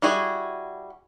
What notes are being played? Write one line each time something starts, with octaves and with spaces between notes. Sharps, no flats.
G3 E4 F#4 G#4